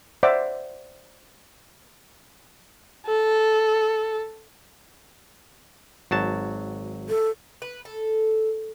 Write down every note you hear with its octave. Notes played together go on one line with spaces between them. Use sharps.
C5 D5 E5 F#5 D6
A4
G#1 F#3 A5
A4
B4
A4